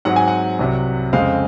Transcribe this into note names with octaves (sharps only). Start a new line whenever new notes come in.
G#2 F#3 C4 F#5
G#5
F#5
C2 C3 F#3
F2 C#3 G#3 C4 F5